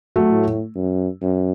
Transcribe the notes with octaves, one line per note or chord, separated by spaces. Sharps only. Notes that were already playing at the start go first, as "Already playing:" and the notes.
F#3 A3
A2
F#2
F#2